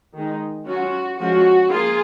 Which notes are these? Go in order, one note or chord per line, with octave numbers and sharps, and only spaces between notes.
D#3 G#3 D#4
F#3 C#4 F4 F#4
F3 G#3 C#4 F#4
F3 A#3 F4 G#4